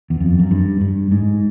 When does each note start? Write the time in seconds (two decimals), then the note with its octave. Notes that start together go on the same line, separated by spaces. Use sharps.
0.10 E2
0.20 F2
0.39 F#2
0.51 G2
0.81 G2
1.11 G#2